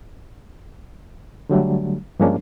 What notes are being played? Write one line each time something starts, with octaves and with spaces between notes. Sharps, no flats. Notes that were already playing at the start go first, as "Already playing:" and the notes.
D3 F#3 G3 A3
G2 F3 G#3 A#3 C#4 D4